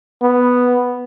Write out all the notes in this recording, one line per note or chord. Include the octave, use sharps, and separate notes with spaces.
B3